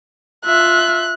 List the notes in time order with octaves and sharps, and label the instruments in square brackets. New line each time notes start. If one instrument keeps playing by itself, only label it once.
[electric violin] F4 E5 [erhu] F#6